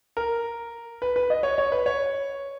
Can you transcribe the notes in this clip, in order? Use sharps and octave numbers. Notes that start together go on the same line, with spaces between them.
A#4
B4
B4
D#5
C#5
C#5
B4
C#5